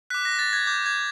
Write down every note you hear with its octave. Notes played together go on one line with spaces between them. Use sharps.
D6 F#6 B6
A#6
A6
G#6
D6 G6
G#6